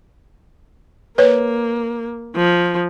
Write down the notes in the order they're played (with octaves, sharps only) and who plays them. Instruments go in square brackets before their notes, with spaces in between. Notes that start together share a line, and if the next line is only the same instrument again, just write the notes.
[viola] A#3 [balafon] B4 C#5
[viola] F3